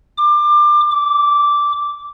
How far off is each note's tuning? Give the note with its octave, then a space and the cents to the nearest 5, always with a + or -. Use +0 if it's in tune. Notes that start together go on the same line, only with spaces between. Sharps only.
D6 +25
D6 -10